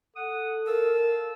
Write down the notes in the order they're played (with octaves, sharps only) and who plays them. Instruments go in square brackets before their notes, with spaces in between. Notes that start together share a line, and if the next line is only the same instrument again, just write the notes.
[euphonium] A4 [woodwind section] F#5 D#6
[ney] A#4 [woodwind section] F5 A5 E6